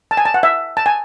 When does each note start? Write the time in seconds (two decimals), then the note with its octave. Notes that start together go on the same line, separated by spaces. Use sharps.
0.11 A5
0.17 G#5
0.25 A5
0.34 F#5
0.43 E5
0.77 A5
0.86 G#5